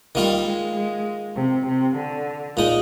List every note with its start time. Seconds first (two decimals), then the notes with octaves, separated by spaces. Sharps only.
0.15 D#3 G3 A#3 F4
0.45 G#3
0.76 G#3
1.35 C3
1.67 C3
1.97 D3
2.57 A#2 G#3 D#4